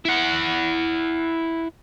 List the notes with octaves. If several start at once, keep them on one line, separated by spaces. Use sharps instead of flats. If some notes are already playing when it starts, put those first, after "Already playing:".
E4 F#5